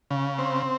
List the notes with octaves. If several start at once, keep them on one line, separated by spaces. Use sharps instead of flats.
C#3
C4